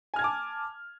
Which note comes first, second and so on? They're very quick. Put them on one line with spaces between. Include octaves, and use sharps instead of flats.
G#5 F6 G#6 A5 D6